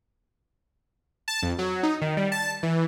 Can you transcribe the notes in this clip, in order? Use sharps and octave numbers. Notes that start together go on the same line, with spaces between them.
A5
F2
F#3
D#4
D#3
G3
A5
E3